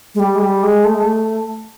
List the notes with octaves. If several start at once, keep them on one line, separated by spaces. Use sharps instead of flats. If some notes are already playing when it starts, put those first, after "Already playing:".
G#3
G3
G#3
G3
G#3
A3
G#3
A3